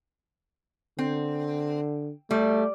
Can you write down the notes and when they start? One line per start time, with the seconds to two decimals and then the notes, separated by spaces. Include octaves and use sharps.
0.99 D3 C4
2.31 G3 A3